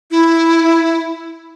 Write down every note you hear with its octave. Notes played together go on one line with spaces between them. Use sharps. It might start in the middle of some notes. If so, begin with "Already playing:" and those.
E4